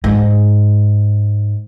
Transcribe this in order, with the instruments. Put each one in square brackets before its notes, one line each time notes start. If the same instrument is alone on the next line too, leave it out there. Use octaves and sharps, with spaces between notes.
[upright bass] G#2